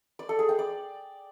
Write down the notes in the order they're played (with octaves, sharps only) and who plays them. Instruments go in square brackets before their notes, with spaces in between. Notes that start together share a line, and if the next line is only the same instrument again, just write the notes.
[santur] D5
A4
G#4
G5
D5